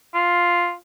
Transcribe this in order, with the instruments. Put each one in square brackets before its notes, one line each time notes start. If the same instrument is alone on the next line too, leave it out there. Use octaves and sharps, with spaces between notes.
[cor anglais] F4